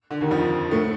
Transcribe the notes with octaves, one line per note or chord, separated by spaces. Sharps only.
D3
D#2 D#3
F2 F3
A2 A3